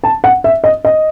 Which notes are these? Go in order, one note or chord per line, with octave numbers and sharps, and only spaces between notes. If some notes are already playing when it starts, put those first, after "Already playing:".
A5
F#5
E5
D#5
D#5